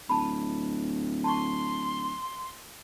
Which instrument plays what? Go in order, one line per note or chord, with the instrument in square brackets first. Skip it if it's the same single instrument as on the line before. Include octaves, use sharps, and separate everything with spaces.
[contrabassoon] D1 [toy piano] A5 B5
[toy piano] A5 C#6 [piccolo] C6